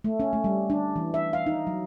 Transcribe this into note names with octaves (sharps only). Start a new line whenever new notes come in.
A3
C#4
A3
G3
D4
E3
E5
F5
D#4
F#3